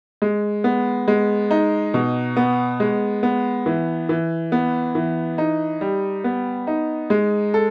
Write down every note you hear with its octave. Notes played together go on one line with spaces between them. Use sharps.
G#3
B3
G#3
D#4
B2
B3
G#3
B3
E3
E3
B3
E3
D#4
G3
B3
D#4
G#3
A4